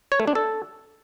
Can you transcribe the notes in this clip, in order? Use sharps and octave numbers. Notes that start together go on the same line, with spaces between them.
C#5
A3
D4
A4